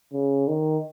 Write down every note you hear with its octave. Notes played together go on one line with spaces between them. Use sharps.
C#3
D#3